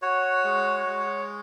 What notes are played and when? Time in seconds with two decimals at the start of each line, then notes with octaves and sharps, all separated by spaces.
0.02 F#4 C#5
0.44 G#3
0.87 G#3